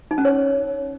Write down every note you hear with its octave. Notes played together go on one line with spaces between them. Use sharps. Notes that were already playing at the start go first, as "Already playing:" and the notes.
D#4
C#4
C#5